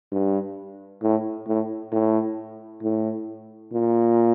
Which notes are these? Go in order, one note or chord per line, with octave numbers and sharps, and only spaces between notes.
G2
A2
A2
A2
A2
A#2